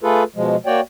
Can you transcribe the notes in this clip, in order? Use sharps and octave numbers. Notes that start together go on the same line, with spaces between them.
A3 F4 G#4 A4 B4
B2 F3 G#3
A#3 F#4 C#5 D5 G5